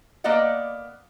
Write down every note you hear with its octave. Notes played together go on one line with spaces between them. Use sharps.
A#3 B3 B4 D5 D#5 F#5